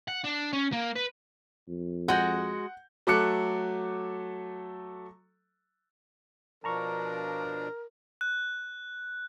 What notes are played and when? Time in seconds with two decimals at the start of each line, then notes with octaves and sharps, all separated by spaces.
0.09 F#5
0.25 D4
0.53 C#4
0.73 A#3
0.96 B4
1.68 F2
2.08 G#3 F#4 F#5 G6
3.07 F#3 A3 A4 D6 F#6 C#7
6.64 B2 F3 D4 A#4 A5 A#5 C#6
8.21 F#6